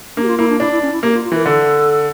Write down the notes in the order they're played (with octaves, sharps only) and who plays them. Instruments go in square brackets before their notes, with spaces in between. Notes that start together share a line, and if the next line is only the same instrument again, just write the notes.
[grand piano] A#3 [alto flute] D4
[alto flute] G4
F4
[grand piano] A#3 [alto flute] E4
[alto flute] D4
[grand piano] D4 [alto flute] E4
[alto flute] E4
C#4
E4
[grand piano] A#3 [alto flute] G4
[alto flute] F4
F4
[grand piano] E3 [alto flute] A#4
[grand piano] D3 [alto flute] A4